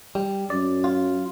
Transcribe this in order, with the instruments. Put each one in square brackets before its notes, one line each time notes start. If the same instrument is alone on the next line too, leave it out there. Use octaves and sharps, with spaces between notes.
[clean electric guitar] G3
[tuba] F#2 [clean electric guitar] D5
[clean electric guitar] F4